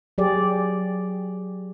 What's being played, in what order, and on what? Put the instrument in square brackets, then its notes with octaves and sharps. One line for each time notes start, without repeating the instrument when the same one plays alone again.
[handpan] F#3 G4 G#4 D5